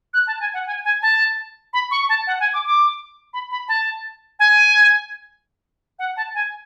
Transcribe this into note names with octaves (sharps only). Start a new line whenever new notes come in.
F#6
A5
G#5
F#5
G#5
G#5
A5
B5
C#6
A5
F#5
G#5
D6
D6
B5
B5
A5
G#5
F#5
A5
G#5